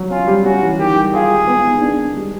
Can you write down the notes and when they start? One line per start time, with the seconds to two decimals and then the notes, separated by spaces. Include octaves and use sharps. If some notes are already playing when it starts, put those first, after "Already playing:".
Already playing: F#3
0.10 C#4 F4
0.28 G3
0.45 C#4 F#4
0.62 E3
0.79 D#3 G4
0.96 G3
1.14 F4 G#4
1.30 G#3
1.47 B3
1.65 D#3
1.82 D4
1.99 G#3
2.17 G3